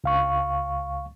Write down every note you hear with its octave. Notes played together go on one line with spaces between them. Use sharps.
C#2 F5 C#6